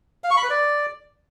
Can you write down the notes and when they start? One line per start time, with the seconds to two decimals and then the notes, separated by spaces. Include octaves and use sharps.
0.24 F5
0.31 C#6
0.37 B5
0.44 B4
0.50 D5